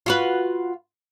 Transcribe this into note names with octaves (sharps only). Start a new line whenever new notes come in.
F4 F#4 B4